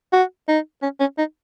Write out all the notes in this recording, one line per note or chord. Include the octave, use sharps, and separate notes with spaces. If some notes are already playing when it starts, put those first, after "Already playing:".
F#4
D#4
C#4
C#4
D#4